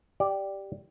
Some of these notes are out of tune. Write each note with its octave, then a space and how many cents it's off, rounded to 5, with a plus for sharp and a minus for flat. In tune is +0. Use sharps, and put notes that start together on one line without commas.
G4 +0 D5 +0